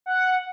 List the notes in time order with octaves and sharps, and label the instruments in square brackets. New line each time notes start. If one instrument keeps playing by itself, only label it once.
[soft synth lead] F#5